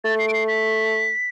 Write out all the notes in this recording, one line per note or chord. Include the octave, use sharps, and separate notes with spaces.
A3 A6
C7
D7
C7
B6